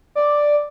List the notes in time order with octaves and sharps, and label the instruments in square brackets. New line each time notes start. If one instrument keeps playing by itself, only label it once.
[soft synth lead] D5